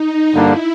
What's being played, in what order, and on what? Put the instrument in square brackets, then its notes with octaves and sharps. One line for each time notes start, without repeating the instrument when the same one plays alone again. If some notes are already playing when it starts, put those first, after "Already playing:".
Already playing: [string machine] D#4
[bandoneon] G2 D3 G3 A#3 D4 [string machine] E4